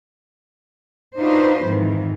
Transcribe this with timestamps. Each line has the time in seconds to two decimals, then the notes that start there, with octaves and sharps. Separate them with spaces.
1.19 D4 D#4 F4 F#4 B4 C5
1.64 F2 G#2 D#3 E3